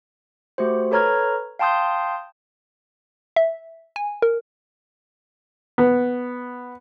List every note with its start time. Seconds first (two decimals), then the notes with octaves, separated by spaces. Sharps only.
0.58 A3 F#4 G4 C5
0.91 A4 B4 C#5 A#5 F6 G#6
1.59 F5 G5 A5 C6 D#6 G6
3.36 E5
3.96 G#5
4.22 A#4
5.78 B3